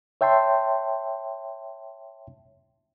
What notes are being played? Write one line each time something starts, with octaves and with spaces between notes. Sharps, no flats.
C#5 E5 G5 A5 C6